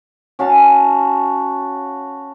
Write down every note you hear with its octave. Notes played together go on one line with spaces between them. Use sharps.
C#4 F#4 F5 A5